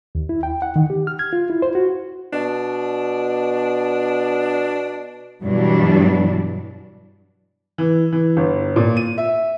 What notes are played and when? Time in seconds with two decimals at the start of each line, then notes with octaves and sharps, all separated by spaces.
0.15 D#2
0.29 E4
0.43 G5
0.62 F#5
0.76 D#3
0.90 G4
1.07 F6
1.19 G#6
1.33 F4
1.50 E4
1.62 C5
1.75 F#4
2.33 B2 D4
5.43 G2 B2 E3 F#3 G3 D4
7.78 E3
8.12 E3
8.37 G1
8.76 A#2
8.97 D#7
9.18 E5